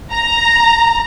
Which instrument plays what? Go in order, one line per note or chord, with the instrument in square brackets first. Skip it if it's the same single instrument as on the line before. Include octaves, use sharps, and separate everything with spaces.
[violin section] A#5